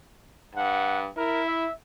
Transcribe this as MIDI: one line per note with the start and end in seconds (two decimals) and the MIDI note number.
0.55 1.08 43
0.55 1.00 78
1.17 1.66 64
1.17 1.41 70
1.47 1.73 76